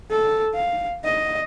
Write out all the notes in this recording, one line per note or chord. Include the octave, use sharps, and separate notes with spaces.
A4
F5
D#5